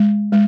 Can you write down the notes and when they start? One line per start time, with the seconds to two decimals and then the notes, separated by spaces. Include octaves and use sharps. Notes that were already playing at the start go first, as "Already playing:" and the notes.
Already playing: G#3
0.32 G#3